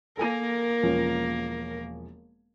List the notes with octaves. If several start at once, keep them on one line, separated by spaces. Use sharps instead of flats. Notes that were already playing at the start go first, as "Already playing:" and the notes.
A#3 A4 A#4 G#5 D#7
E1 F3 C#4